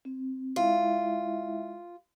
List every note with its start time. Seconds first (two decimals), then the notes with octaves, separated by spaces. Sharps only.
0.05 C4
0.56 G#3 E4 F4 E5